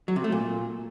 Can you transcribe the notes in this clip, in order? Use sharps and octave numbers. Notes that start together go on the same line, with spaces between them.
F#3
C3
A3
A#2